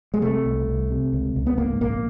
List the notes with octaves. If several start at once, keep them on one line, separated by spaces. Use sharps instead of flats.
G#3
C3 A3
C2
C2
C3
C#2
C#2
B3
G#2 A#3
A#1 A#3